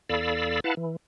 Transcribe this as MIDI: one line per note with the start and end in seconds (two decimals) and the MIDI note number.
0.09 0.60 40
0.09 0.60 69
0.09 0.60 74
0.09 0.60 77
0.09 0.60 83
0.09 0.60 88
0.64 0.75 64
0.64 0.75 71
0.64 0.75 77
0.64 0.75 78
0.64 0.75 81
0.77 0.96 52